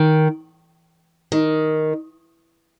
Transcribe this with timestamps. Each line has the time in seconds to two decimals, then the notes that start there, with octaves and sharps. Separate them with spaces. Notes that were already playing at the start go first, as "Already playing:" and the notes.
Already playing: D#3
1.32 D#3